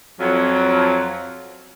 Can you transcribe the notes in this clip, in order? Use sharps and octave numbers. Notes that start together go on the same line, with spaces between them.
F2 F#3